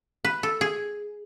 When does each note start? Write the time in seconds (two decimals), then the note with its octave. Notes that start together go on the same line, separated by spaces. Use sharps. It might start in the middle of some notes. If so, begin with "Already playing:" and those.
0.25 B4
0.43 A4
0.61 G#4